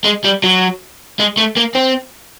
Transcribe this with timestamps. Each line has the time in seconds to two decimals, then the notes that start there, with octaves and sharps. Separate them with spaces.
0.05 G#3
0.25 G3
0.44 F#3
1.19 G#3
1.37 A3
1.57 A#3
1.75 C4